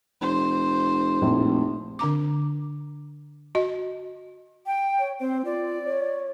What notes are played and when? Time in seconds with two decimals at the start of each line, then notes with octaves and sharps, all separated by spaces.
0.22 F1 C5
1.22 A#1 F2 A2
1.99 D3 D4 A#5 D6
3.55 F#4 D#5
4.66 G5
4.99 C#5
5.20 C4 C5
5.45 F4 D5
5.85 C#5